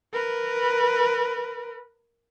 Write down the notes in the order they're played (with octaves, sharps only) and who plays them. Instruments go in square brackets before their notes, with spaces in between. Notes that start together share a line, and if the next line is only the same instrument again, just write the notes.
[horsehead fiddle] A#4 B4